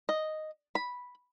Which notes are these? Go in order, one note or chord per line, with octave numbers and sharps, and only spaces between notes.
D#5
B5